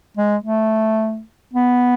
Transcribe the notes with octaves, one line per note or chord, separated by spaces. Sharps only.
G#3
A3
B3